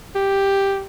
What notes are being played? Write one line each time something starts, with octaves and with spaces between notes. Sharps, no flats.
G4